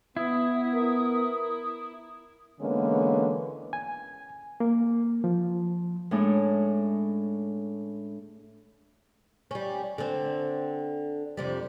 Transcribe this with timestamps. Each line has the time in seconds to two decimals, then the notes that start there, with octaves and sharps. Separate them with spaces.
0.17 B3 E4 D#6
0.74 A#4
2.61 D3 E3 G#3 A#3 B3 C#4
3.73 G#5
4.60 A#3
5.24 F3
6.11 A2 G#3 C#4 D4
9.51 G3 C#4
9.98 D3 C4
11.37 F2 C3 G3